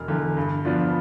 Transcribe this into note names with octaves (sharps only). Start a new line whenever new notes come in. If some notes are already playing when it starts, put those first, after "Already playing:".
Already playing: E1 F6
E2 D3
G2
F3 B3 D4 F4